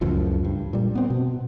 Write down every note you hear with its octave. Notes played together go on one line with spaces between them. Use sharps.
C#2 F#2 A2 F3
G2
A#2 G3
B3 C4
B2